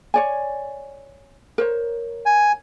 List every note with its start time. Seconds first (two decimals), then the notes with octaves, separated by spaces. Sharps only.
0.14 C#5 D5 G#5
1.58 A#4 C5 C#5
2.26 G#5